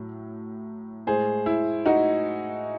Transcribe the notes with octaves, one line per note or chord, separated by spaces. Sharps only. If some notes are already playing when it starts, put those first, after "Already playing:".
Already playing: A2 F#3
A2 G#3 G#4 C5
E4
D#4 F#4